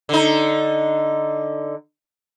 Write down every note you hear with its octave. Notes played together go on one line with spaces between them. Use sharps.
D3 D#4